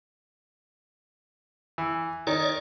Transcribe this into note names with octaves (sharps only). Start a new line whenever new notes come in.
E3
D#3 C#5 D5